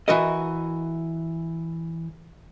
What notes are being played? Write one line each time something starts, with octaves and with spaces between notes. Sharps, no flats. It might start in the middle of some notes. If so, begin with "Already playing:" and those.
E3 F#4 A#4 D#5